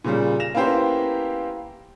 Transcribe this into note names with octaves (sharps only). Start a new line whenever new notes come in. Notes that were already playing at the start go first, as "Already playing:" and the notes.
A#2 C#3 G3
A#6 E7 F7
A#3 B3 C#4 E4 G4 C5